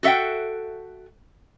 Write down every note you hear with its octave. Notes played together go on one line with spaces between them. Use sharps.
F#4 A4 E5 F#5 G5